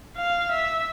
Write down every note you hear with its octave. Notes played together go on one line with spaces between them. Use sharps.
F5
E5